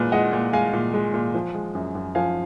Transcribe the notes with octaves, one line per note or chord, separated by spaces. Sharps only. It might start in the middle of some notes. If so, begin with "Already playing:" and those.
Already playing: A#2 G#3 G#4 B4
G#3 D#5 F#5
A#2
G#3 F5 G#5
A#2
G#3
A#2
F3
G#3
F#2
F#2
F3 F5 G#5